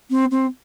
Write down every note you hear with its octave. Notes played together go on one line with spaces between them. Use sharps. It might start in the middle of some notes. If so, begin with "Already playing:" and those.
C4
C4